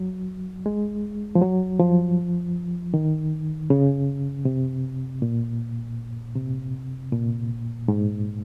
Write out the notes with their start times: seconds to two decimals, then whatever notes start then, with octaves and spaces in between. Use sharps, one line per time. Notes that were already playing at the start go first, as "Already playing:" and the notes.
Already playing: F#3
0.66 G#3
1.35 F3
1.42 F#3
1.79 F3
2.94 D#3
3.70 C#3
4.45 C3
5.22 A#2
6.36 C3
7.13 A#2
7.88 G#2